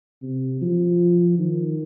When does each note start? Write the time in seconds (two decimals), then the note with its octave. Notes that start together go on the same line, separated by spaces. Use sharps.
0.23 C3
0.62 F3
1.39 D#3